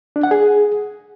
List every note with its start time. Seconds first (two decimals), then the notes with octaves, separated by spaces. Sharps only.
0.16 D4
0.23 F#5
0.31 G#4